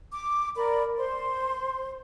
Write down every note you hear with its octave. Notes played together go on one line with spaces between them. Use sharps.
D6
A#4 D5 B5
C5 C6